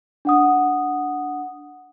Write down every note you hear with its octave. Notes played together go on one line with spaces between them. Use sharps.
D4 F#5 D#6